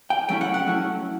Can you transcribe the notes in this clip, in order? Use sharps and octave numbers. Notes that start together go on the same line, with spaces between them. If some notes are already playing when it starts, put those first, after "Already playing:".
G5
F#3 A3 C#4 E4 G5
F#5
F#5
F#3 A3 C#4 E4